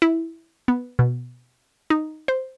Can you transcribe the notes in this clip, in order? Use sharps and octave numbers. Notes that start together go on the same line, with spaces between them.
E4
B3
B2
D#4
C5